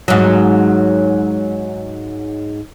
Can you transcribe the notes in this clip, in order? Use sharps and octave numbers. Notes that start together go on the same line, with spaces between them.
G#2 F#3